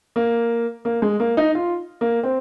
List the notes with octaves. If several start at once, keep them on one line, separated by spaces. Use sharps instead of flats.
A#3
A#3
G#3
A#3
D#4
F4
A#3
C4